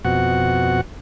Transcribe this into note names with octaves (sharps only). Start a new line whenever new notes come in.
F2 B2 F#4 F#5